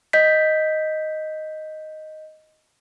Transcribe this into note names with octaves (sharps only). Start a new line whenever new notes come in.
D#5 G6 B6